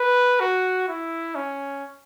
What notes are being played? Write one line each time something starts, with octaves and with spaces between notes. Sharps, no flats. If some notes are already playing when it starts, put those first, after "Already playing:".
Already playing: B4
F#4
E4
C#4